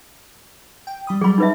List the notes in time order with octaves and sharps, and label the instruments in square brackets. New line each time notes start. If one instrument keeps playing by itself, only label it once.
[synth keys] G5
G3 B5 D#6
[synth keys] F#3 G3 [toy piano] G#4 B5
[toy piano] D#4 B4 E5